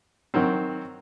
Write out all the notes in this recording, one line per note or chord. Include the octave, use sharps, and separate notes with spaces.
D#3 F#3 C4